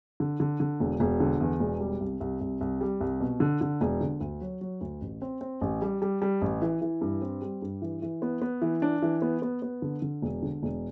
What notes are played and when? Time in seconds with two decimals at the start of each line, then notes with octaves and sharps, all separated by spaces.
0.20 D3
0.40 D3
0.60 D3
0.80 E1
1.00 E1
1.20 D3
1.41 E2
1.60 E1
1.80 G3
2.00 C2
2.20 C2
2.41 C2
2.61 C2
2.81 G3
3.01 C2
3.21 B2
3.40 D3
3.61 D3
3.81 E1
4.01 D3
4.21 D2
4.41 F#3
4.61 F#3
4.81 D2
5.01 A1
5.22 C4
5.41 C4
5.61 A1
5.82 G3
6.02 G3
6.22 G3
6.42 A1
6.62 E3
6.82 E3
7.01 G2
7.22 C4
7.42 G3
7.62 G2
7.82 E3
8.02 E3
8.22 B3
8.42 B3
8.62 E3
8.82 D4
9.02 E3
9.22 B3
9.42 B3
9.62 B3
9.82 D3
10.02 D3
10.22 E1
10.42 D3
10.63 E1